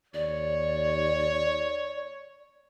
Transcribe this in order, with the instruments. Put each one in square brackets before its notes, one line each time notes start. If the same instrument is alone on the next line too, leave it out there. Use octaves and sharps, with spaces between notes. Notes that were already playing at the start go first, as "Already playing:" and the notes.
[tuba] D#2 [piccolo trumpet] C#5 [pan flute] D5